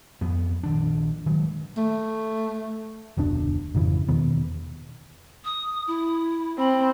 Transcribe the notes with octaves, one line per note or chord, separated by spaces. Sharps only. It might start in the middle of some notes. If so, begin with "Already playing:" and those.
F2 B3
A#1 D#3 D4
D#3 F#3 G#3
A3
F1 D2 B2 D4
G#1 F2 C#3 E3
E2 B2 D#3 B3
D#6
E4
C4 B5